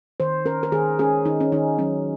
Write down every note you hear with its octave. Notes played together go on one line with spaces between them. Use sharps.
D#3 C5
C#4 A#4
A#4
D#3 G#4
C#4 G#4
D#3 D#4
C#4
D#3 D#4
F#3 C#4